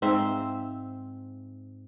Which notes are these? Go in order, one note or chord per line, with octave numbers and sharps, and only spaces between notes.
G#2 C4 E5 F5